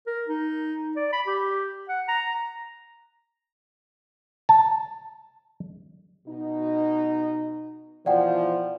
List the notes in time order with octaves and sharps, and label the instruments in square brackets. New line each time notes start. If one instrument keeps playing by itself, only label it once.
[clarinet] A#4
D#4
D5
B5
G4
F#5
A#5
[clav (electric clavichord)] A5
[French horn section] B2 D#4
[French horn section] B2 E3 F3 [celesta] D5 F#5 G5